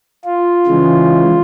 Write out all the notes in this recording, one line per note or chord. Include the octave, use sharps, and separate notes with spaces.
F4
C#3 E3 G#3